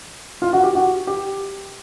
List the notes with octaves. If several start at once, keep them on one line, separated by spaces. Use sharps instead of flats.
F4
F#4
G4
F#4
G4